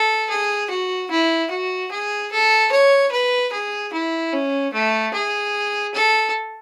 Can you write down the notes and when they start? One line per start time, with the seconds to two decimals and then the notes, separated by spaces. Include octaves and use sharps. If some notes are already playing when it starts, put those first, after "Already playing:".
Already playing: A4
0.30 G#4
0.70 F#4
1.10 E4
1.50 F#4
1.91 G#4
2.31 A4
2.72 C#5
3.12 B4
3.52 G#4
3.93 E4
4.33 C#4
4.73 A3
5.14 G#4
5.94 A4